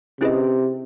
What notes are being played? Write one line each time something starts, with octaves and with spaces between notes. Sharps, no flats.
C3 C#4 E4 G#4 B4 D#5